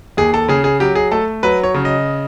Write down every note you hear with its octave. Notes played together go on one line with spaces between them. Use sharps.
D#2 G#4
A4
C#3 G#4
G#4
F#3 G4
G#4
A3 A4
F#3 B4
C#5
C#3
D#5